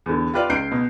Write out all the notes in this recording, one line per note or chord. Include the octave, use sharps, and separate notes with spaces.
E2 D3
F4 G4 B4 D5 F5
C#2 G6 C7 D7
B2